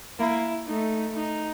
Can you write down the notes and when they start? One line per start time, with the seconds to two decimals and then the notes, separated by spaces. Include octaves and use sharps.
0.19 A#3 E4
0.66 A3 D#4
1.14 D#4